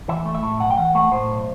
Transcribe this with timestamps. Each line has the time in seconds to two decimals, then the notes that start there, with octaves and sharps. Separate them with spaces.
0.09 E3 E5
0.25 A3
0.35 E5
0.43 A2
0.60 B1 F#5
0.71 G5
0.77 E3 F#5
0.95 A3 F#5
1.11 A2 C5
1.29 B1